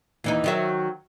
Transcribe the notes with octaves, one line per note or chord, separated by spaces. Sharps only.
D#2 E3 D#4
D#3 F#3 E5